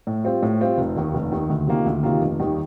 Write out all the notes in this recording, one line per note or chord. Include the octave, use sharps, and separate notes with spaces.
A2
G3 C4 F4
A2
G3 C4 F4
F1
D#2 D#3
F1
D#2 D#3
D2
C3 D#3 A#3 F4
D2
C3 D#3 A#3 F4
F1
D#2 D#3 G3